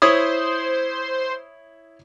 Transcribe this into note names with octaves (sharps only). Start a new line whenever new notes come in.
E4 C5 C#5 D#6